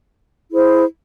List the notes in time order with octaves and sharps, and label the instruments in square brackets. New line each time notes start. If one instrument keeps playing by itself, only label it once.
[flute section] E4 G#4 C5